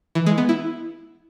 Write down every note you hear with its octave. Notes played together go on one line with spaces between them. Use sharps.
E3
G#3
B3
E4